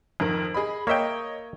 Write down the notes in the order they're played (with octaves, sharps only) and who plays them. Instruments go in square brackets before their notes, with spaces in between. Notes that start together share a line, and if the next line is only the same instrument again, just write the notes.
[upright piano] F2 D#3 A#4
G#4 D#5 B5
[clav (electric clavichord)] A#3 E5 G5 [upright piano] C#5 D#5